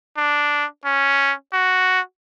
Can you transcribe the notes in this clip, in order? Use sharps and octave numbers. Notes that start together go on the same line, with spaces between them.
D4
C#4
F#4